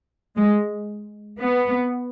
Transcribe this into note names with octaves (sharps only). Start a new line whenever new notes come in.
G#3
B3